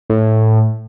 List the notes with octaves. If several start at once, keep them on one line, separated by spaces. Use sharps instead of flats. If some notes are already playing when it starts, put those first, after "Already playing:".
A2